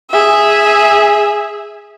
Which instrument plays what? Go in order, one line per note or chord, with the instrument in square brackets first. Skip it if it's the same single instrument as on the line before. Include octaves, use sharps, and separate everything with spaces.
[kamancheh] G#4 E5